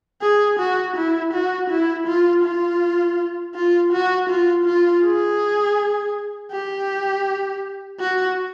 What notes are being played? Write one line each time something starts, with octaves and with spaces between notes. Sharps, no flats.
G#4
F#4
E4
F#4
E4
F4
F4
F4
F#4
F4
F4
G#4
G4
F#4